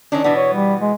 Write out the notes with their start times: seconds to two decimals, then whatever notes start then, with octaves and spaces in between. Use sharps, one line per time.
0.12 D#3 C#4 D4
0.24 B2 E3 B3 D4
0.36 C#5
0.53 G3
0.81 G#3